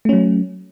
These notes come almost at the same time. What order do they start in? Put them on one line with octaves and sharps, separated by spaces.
A3 C#4 F#3